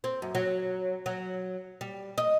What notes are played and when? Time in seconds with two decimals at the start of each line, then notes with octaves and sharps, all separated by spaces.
0.04 C4
0.22 F#2
0.35 F#3
1.06 F#3
1.81 G3
2.18 D#5